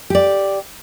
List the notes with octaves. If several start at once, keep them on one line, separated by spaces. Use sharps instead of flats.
G4 D5